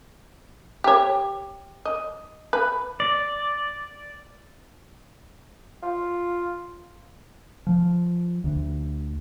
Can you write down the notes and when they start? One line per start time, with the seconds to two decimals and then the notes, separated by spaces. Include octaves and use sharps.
0.84 G4 C#5
1.85 D#5
2.53 B4
3.00 D5
5.83 F4
7.67 F3
8.44 D2